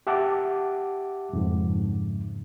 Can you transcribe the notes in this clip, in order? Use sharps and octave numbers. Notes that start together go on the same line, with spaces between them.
G4 E5 F#5 A5 D6
F2 G#2 C#3